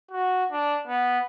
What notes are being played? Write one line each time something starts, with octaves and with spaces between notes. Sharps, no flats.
F#4
D4
B3